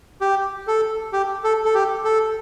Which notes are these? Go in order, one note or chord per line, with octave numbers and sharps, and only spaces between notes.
G4
A4
G4
A4
A4
G4
A4